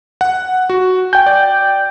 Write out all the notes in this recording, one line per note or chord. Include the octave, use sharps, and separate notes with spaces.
F#5
F#4
G5 G#5 G6
D5